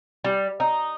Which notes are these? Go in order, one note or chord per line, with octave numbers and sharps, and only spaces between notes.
G3
D#4